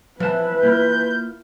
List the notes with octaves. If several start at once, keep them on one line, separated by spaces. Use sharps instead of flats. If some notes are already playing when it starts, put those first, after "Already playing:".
E3 F3 B4 A5
A#3 E4 F4 G6